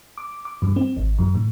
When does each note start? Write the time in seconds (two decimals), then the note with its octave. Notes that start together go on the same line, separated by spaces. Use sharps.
0.18 D6
0.45 D6
0.62 G2
0.76 C4
0.97 G#1
1.19 F#2
1.35 A2